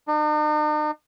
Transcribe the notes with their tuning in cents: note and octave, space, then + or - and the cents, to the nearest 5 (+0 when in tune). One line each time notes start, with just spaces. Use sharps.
D#4 -45